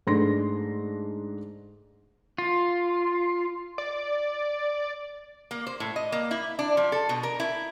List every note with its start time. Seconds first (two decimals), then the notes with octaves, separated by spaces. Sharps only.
0.07 G#2 A3 D4 C6 A#6
2.38 F4
3.78 D5
5.51 A#3
5.67 C5
5.80 A2
5.96 D#5
6.12 A#3
6.31 E4
6.59 D4
6.77 F3
6.92 A4
7.09 B2
7.23 A#4
7.40 E4